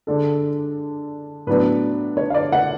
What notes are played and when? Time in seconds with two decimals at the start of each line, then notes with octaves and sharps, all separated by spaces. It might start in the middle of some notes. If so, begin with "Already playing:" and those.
0.07 D3 G#3 D4 A4
1.47 A2 F#3 B3 D4 B4
2.17 C#5
2.30 F5
2.34 D5
2.52 F#5